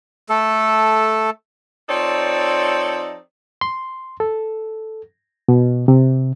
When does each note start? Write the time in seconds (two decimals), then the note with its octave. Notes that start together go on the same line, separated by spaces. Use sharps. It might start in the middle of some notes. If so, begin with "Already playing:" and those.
0.29 A3 A4
1.89 F3 C4 D#4 A4 C#5 D5
3.61 C6
4.20 A4
5.48 B2
5.88 C3